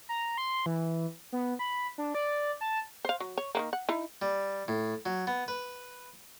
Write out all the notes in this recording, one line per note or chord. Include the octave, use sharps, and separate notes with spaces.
A#5
C6
E3
B3
B5
D4
D5
A5
C5 F5
F#3
C#5
D#3 E3 A#3
F#5
D#4 E4
G3
A2
F#3
B3
B4